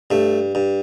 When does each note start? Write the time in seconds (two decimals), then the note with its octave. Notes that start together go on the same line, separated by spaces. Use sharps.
0.11 G2 A3
0.55 G2